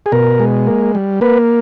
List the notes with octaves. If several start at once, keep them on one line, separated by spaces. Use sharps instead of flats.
G#4
B2 A#4
G#3
A#3
G3
A#3 B4